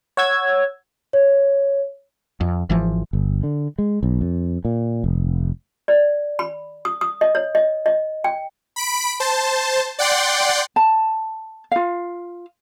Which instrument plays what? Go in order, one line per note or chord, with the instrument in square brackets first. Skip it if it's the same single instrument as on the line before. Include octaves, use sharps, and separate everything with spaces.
[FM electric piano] C#5 F#5 E6 G#6
[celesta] C#5
[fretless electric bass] F2
G#1 E3 F3
G1
D3
G#3
B1
F2
A#2
F1
[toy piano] D5
B5
D#6
D#6
D#5
C#5
D#5
D#5
G5
[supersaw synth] B5 B6 D7
C5 A5
D5 F#5 G5 C6
[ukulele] A5
F4 F5